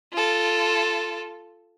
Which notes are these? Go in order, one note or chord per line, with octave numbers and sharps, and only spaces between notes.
F4 A4